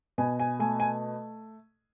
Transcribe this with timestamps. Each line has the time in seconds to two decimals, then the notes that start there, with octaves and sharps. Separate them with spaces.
0.18 B2 G#5
0.40 G#5
0.59 A3 G#5
0.80 G#5